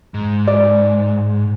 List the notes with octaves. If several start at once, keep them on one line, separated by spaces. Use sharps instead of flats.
G#2
D5